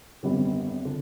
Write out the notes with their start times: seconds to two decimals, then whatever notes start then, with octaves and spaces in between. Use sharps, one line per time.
0.23 G#1 F#2 D3 G3 B3
0.85 D3